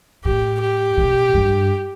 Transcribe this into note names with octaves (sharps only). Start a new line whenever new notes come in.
A2 G4
G4
B2
G2